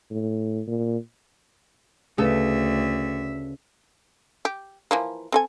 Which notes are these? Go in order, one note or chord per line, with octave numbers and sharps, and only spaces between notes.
A2
A#2
D2 C#3 A3 A4 B4 E5
G4
E3 F3 A#3
C4 A4 G#5